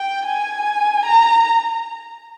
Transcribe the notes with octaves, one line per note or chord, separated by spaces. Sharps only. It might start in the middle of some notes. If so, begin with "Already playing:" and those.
Already playing: G5
G#5
A#5